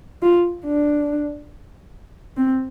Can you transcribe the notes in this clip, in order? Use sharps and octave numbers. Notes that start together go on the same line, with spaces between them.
F4
D4
C4